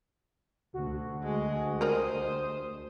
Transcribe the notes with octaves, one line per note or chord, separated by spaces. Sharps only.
D2 F#4
G#3
G3 A#4 C5 D#5 D#6